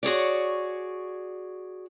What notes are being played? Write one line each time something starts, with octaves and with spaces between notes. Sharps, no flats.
F#4 G#4 C#5 D5